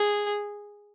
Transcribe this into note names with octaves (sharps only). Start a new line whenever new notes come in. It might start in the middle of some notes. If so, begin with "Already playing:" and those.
Already playing: G#4